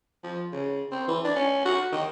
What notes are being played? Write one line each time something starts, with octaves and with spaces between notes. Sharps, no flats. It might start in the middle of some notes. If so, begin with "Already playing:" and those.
F3
C#3
C4
E3
D4
C#4
F#4
D#3